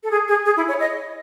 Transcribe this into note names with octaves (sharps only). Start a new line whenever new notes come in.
A4
G#4
G#4
G#4
E4
C#5
D#5